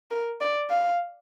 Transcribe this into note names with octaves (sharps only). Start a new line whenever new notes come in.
A#4
D5
F5